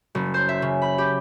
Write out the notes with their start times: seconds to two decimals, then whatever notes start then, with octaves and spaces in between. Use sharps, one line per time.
0.15 F#1
0.34 C5
0.49 E5
0.62 C#3
0.82 B5
0.98 G4